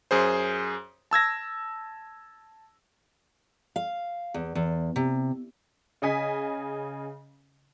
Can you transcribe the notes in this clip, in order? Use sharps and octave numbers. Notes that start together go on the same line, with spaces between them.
F#2 G#4 C5
A5 E6 G#6 A#6
F5
E2
E2
C3
C#3 D#5 G#5 B6